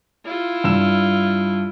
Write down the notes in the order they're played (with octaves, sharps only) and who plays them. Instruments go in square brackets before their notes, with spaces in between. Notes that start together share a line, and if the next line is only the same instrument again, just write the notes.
[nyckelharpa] E4 F4
[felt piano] G2 E6 E7